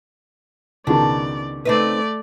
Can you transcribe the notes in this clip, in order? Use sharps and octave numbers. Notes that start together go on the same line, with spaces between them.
C#2 B2 D#3 D4 D5
A3 C4 D#4 B4 D5